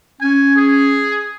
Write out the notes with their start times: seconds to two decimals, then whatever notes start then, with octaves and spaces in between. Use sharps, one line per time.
0.21 C#4 G#5
0.56 G#4